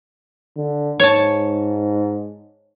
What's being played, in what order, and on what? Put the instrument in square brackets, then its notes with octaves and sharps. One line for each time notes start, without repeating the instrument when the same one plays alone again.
[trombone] D3
[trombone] G#2 [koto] C#5 A5